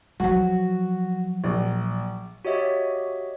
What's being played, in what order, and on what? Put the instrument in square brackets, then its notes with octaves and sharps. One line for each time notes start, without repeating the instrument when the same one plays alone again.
[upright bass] F3 F#3 [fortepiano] F#4
[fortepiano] A#1
[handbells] F#4 G4 C#5 D#5 E5